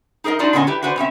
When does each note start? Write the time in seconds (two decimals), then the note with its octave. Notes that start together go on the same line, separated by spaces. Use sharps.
0.24 D#4 G#4 A#4 D5 D#5
0.39 D4 D#4 F4 F#4 D5
0.53 A#2 D3 B3 C#4 D#5 G#5
0.67 E4 G4 B4
0.82 F#4 G#4 B4 C5 D5
0.96 B2 C4 C#4 E5